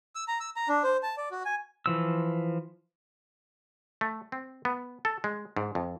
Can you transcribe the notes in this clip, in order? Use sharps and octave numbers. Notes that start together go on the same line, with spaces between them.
E6
A#5
E6
A#5
D4
C5
A5
D5
F#4
G#5
E3 F3 E6
A3
C4
B3
A4
G#3
G#2
F2